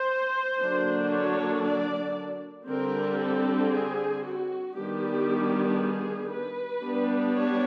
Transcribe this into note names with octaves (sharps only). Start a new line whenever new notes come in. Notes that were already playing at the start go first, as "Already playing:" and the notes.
Already playing: C5
D3 F#3 A#3 D4
C#5
D5
D3 G3 C4 A#4
A4
G#4
F#4
D#3 G3 B3 D4 G4
G#4
B4
G3 B3 D4
C#5